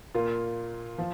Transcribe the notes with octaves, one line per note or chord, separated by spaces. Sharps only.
A#2 A#3 F4
F3